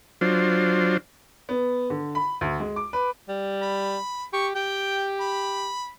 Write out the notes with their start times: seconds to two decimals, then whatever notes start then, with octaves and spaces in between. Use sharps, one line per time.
0.21 F#3 D4 F4 C5
1.49 B3
1.90 D3
2.15 B5
2.41 D2
2.60 G#3
2.76 D6
2.93 B4
3.29 G3
3.62 B5
4.33 G4 C#6
4.55 G4 G5
5.20 B5